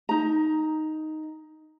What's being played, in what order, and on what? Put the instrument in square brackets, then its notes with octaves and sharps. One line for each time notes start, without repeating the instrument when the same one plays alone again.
[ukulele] D#4 A#5